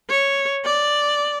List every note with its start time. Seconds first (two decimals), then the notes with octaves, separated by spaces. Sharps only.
0.10 C#5
0.65 D5